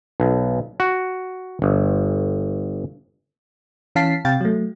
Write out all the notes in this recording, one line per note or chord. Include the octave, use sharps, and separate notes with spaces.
B1
F#4
G1
E3 C#4 F5 A5 B6 C7
C3 F5 G5 A6
F#3 A3